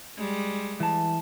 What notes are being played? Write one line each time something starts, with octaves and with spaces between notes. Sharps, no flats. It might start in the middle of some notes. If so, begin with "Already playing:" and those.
G3 G#3
E3 A5